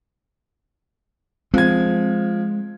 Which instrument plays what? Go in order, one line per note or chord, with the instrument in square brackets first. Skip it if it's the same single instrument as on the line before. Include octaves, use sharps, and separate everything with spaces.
[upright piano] F3 G#6 [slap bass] G#3 [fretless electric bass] C4